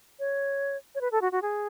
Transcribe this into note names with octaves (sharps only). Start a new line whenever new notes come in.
C#5
C#5
B4
A4
F#4
F#4
G#4